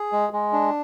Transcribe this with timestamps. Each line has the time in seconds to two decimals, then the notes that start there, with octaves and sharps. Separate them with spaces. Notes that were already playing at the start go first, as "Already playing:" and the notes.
Already playing: G#4
0.12 G#3
0.33 G#3
0.53 D4